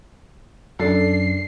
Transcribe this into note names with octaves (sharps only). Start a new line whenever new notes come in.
F#2 D4 A4 C7